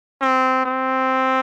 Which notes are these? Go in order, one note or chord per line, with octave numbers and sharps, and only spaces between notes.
C4
C4